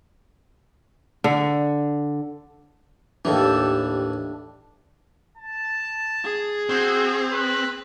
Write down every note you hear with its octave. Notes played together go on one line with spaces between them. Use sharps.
D3
D#2 A2 E3 D4 G4 A4
A5
G#4
C4 F#4
B4